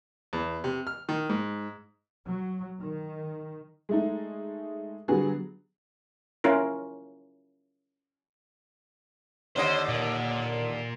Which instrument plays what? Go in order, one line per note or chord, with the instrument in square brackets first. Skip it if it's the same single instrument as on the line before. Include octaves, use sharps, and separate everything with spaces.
[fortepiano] E2
C3
F6
D#3
G#2
[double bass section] F#3
D#3
[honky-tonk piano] G#3 A3 D#4
D3 F#3 G3 B3 F#4 G#4
[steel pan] C#4 E4 F4 A#4
[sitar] D#2 D3 D#5 [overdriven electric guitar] C5
[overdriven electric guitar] A#2